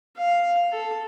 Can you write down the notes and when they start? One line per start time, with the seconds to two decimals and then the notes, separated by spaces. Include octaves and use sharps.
0.17 F5
0.72 A4